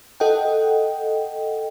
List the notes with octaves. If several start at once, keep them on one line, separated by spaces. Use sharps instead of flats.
A4 D#5 F#5 G5